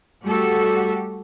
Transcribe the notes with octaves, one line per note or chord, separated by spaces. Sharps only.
G3 A3 F#4 G4 A4